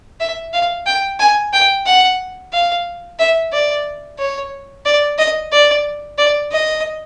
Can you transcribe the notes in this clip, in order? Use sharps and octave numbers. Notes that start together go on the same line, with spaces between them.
E5
F5
G5
G#5
G5
F#5
F5
E5
D5
C#5
D5
D#5
D5
D5
D#5